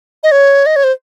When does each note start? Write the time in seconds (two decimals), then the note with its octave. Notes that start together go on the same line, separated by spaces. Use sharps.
0.23 D#5
0.32 C#5
0.66 D#5
0.76 C#5
0.84 C5